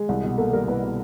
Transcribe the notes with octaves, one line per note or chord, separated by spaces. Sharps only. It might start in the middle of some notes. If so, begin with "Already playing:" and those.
Already playing: G#3
C2
B2
A#3 A4
G3 A#4
C2 B4
B2